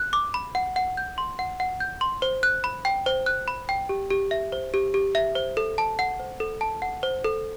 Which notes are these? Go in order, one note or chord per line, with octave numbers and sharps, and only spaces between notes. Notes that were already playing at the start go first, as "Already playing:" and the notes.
Already playing: F#6
D6
B5
F#5
F#5
G6
C6
F#5
F#5
G6
C6
C5
F#6
B5
G5
C5
F#6
B5
G5
G4
G4
E5
C5
G4
G4
E5
C5
A4
A5
F#5
C5
A4
A5
F#5
C5
A4